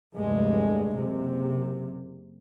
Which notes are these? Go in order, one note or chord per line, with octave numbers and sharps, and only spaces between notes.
F1 D2 G2 G#3
F#1 C3